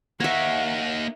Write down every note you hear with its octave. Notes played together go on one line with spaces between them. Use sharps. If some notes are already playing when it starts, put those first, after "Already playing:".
A#3 D#4 C#5 E5 F#5